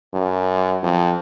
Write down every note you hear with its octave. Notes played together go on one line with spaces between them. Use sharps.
F#2
F2